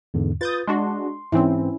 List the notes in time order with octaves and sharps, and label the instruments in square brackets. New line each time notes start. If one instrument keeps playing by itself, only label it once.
[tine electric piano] E2 G#2 D3
[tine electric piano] F4 B4 [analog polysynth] D#6 G6 A6
[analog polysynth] G#3 D4 F#4 [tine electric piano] C6
[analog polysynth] G#2 E3 C4 [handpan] C#4 E4